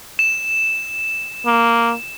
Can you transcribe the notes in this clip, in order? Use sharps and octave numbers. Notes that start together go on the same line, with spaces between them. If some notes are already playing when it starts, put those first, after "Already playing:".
E7
A#3